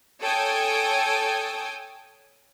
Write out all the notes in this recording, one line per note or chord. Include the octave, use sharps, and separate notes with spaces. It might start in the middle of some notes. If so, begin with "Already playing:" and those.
A4 C#5 G5 G#5 D#6